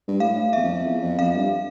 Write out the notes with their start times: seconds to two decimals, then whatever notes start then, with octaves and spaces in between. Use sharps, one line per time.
0.08 G2
0.20 A2 F5
0.53 E2 E5
0.64 F2
0.86 E2
1.02 F2
1.19 F2 F5
1.36 G2